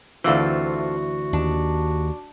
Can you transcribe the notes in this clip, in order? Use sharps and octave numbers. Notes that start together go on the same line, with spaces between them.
D2 E3 C4 F4 F#4 A4
D#2 D4